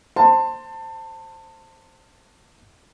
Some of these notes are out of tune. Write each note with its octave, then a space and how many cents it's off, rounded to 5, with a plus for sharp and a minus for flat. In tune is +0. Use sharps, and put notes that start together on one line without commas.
C5 +10 A5 +25 C6 -5